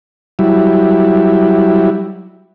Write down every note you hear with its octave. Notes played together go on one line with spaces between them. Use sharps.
F#3 G3 E4